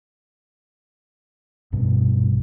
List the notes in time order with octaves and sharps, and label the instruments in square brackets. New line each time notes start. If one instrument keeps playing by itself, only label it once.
[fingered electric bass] A#1 G2 B2